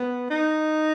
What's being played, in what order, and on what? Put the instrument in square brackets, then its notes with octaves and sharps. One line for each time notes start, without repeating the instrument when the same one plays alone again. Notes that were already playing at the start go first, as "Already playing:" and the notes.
Already playing: [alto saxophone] B3
D#4